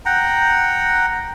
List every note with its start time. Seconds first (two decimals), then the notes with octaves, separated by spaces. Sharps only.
0.05 F#5 G5 A#5